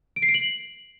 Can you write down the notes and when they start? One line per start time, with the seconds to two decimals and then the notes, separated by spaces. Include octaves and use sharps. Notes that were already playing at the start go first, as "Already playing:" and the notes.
0.16 D7
0.22 C7
0.28 D7
0.34 F#7